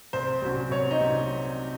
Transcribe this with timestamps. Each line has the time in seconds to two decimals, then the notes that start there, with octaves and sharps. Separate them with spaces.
0.13 C2 C5
0.42 C3 F#3 C#4
0.71 C2 C#5
0.91 D#4
1.00 C3 F#3 C#4